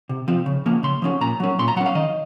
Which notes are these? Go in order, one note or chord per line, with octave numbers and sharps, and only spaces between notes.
C3
F3 C4
C#3
F3 A#3 C#4
C#3 C6
F3 A#3 C#4
A#2 A#5
F#3 C#4
A#2 C6
A#5
F#3 C#4 F#5
F5
D#3 D#5